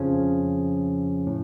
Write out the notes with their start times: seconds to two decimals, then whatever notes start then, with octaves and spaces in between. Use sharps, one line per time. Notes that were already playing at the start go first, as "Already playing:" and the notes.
Already playing: F2 C#3 F3 C#4
1.27 A2